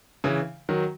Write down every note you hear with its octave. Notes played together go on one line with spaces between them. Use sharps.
C#3 E3
D#3 F#3